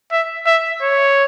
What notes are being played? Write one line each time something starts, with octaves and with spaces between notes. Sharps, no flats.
E5
E5
C#5